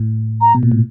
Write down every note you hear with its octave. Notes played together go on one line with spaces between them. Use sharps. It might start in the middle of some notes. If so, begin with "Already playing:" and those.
Already playing: A2
A#5
B2
A#2
A2